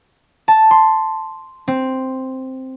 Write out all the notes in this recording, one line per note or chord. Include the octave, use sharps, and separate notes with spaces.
A5
C6
C4